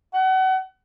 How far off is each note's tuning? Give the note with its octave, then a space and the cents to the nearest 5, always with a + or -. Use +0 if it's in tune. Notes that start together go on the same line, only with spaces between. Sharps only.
F#5 +30